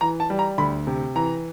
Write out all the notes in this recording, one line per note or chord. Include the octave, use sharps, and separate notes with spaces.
E3 A#5
A5
G3
A#5
D2 B5
C3
E3 A#5